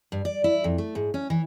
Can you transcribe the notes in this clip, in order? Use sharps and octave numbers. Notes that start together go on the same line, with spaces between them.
G2
D5
E4
F2
A3
G#2
C#4
E3